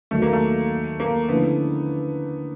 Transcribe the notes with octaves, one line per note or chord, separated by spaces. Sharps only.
D#2 D#3 F#3 A3
A#3
A3
A#3
D3 F3 A3 B3 C#4 E4